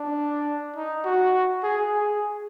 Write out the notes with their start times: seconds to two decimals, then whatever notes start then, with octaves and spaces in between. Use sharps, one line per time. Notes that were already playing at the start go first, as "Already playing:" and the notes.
Already playing: D4
0.76 D#4
1.05 F#4
1.63 G#4
1.92 G#4